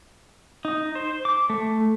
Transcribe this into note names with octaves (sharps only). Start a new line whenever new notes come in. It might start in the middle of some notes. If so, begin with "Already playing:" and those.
D#4
C5
D6
A3